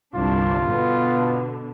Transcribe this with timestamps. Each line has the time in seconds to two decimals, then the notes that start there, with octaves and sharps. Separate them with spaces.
0.15 G1 C2 D4 F4
0.70 B2 D3 B3